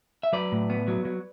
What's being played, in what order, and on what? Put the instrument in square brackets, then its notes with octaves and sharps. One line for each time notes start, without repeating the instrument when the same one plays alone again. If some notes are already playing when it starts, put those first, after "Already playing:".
[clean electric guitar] E5
F#3 B4 D5
A2
B3
F#3
F#3